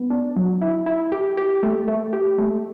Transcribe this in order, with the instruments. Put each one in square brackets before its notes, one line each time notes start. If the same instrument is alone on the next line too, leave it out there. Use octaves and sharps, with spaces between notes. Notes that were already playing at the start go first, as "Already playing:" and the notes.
Already playing: [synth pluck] B3
D4
F#3
E4
E4
G4
G4
A3
A3
G4
A3